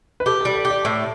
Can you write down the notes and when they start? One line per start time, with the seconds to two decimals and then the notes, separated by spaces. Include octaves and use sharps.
0.20 B4
0.26 G4 A4
0.41 A4
0.45 G3
0.56 D5
0.65 G4
0.70 D5
0.85 A2